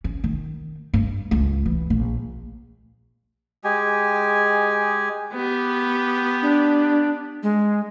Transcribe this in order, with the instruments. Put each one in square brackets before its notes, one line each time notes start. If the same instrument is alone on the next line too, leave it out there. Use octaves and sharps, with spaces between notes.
[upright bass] C#4
D#3
G2
C#2
E3
A#1
[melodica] G#3 G4 G#5
[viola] B3 G4
[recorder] D4
G#3